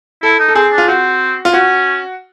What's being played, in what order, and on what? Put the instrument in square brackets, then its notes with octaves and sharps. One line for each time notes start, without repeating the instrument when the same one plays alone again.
[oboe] E4 [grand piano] A4
[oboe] D#4
[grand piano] A4
[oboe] C4 [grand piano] G#4
[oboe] D4
[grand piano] F4
[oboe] C4 [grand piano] F#4
[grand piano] F4
[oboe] C#4 [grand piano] F#4